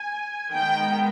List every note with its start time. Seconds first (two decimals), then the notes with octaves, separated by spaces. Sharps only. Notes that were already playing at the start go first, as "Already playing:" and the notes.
Already playing: G#5
0.54 D#3 G#3 B3 G5